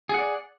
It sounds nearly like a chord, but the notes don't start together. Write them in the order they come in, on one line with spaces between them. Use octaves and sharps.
G#4 F#5 D5